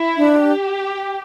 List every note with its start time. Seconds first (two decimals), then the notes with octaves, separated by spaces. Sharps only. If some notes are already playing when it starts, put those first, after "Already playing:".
Already playing: E4
0.17 D4
0.40 G4